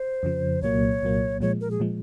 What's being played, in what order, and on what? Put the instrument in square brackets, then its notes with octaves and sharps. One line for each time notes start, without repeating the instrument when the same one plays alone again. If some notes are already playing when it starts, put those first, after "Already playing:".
Already playing: [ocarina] C5
[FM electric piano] F2 C#3 F3
[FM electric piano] C2 A#2 F#3 A#3 [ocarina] C#5
[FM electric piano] C2 A#2 F#3 A#3
[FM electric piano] A#2 F3 G#3 [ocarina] C#5
[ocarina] A#4
G#4
[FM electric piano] A#2 F3 G#3